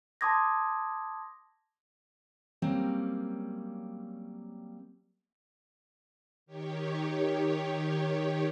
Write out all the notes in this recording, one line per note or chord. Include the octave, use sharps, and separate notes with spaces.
A5 C6 D6 D#6 G#6 A#6
F#3 G3 A#3 C4 C#4
D#3 G4 C#5